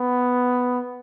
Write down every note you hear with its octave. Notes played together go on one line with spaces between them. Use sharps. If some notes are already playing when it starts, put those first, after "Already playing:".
Already playing: B3